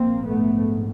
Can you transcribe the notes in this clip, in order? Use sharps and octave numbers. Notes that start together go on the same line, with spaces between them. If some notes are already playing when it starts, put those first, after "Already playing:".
Already playing: A#1 G#2 A#3 C4
A3 B3